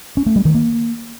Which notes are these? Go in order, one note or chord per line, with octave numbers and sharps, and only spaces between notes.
C#4
A3
G3
D#3
A#3